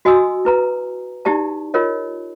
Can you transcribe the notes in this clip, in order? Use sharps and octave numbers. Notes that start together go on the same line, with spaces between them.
F#4 D#5 G#5 C6 D#6 E6
E4 B4 A#5
D#4 E4 G4 D5 A5
F4 A#4 C#5 D#5